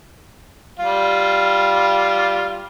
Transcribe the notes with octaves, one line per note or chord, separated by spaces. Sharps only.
G3 F4